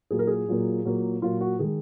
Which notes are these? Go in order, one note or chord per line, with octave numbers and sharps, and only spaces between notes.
A#2 F#3 A#3 G#4
A#4
G#4
A#2 F#3 A#3
A#2 F#3 A#3
A#2 F#3 A#3 F4
F#4
D#3 G#3 G#4